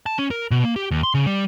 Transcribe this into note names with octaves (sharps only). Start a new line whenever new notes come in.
A5
C#4
A#4
B2
A#3
G4
D#2
C6
C#3
G3